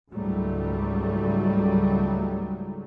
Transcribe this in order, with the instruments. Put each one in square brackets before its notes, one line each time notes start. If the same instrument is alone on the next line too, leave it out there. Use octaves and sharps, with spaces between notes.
[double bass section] C#2 G#2 F#3 G3 A3